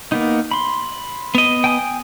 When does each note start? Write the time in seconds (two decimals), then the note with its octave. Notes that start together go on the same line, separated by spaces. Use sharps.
0.12 A#3 B3 D#4
0.51 B5 C6
1.35 B3 D#5
1.64 G5 G#5 D#6